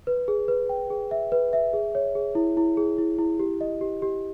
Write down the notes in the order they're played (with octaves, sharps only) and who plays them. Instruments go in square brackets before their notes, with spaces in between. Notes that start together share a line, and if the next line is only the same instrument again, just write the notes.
[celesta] B4
G#4
B4
G5
G#4
E5
B4
E5
G#4
C#5
G#4
E4
E4
G#4
E4
E4
G4
D#5
G4
G4